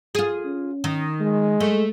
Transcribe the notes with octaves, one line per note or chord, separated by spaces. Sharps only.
F4 G#4
C#4
D#3
G#3
A3